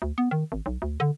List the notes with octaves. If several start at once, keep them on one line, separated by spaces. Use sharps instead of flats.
D2
B3
D#3
G#1
B1
D2
D3